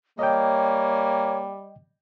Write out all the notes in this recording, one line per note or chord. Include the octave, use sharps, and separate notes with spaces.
G3 A#3 C#5 D#5 G5